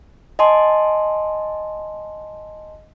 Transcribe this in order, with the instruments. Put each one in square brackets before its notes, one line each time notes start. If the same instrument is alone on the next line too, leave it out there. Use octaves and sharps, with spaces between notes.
[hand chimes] D#5 G#5 A5 C6